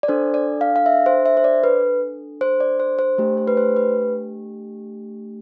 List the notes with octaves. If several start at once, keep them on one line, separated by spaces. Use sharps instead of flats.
D5
D4 A4 C5
D5
F5
F5
E5
C5
E5
C5
D5
B4
C5
D5
C5
C5
A3 D4 G4
C5
B4
C5
B4